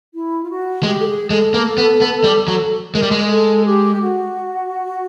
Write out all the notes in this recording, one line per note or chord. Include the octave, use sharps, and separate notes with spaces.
E4
F4
F#4
G#3 G4
A4
G#4
G#3 A4
A#3
B3
B3
G3
F#3
G#3 A#4
G3
G#3
A4
G4
F#4